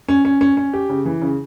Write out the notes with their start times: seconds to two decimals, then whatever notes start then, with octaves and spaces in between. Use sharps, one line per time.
0.08 C#4
0.25 C#4
0.41 C#4
0.57 C#4
0.73 G4
0.89 C#3
1.05 E3
1.22 C#3